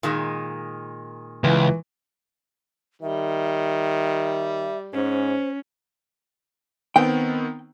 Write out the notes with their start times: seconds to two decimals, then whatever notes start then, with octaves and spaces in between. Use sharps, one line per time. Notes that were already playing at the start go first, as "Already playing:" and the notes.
0.03 A#2 D#3 G#3
1.44 C#2 E3
3.02 D#3 G3 E5
4.93 G#2 C#4 C5
6.96 D#3 B3 C4 G5